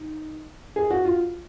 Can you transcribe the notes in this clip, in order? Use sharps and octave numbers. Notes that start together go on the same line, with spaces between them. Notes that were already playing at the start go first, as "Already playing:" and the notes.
Already playing: D#4
G#4
F#4
F4